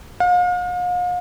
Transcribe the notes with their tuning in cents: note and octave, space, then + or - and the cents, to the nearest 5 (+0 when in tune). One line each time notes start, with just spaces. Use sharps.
F5 +40